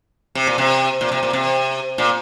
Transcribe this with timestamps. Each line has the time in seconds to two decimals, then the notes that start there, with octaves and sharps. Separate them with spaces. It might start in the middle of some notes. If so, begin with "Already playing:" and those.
0.35 C3
0.47 A#2
0.58 C3
1.01 A#2
1.12 C3
1.23 A#2
1.33 C3
1.98 A#2